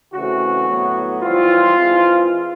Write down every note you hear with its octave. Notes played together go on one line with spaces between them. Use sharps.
C#3 E3 A3 C4 F#4
A2 F#3 B3
E3 G3 C4 F4
E3 G#3 C4